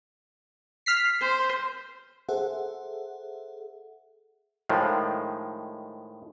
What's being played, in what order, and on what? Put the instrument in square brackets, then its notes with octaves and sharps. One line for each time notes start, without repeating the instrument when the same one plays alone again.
[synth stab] F6 B6 C7
[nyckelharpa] C5
[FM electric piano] G#4 A4 C5 E5 F#5
[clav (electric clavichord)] A2 D#3 F3 G#3